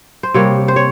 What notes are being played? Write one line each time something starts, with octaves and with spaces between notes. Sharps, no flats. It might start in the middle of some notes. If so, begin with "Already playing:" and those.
C5
C3 G3 A#3 C#5
C5
C#5